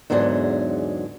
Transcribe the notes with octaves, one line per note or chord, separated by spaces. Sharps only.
E2 G#2 D3 F#3 G#4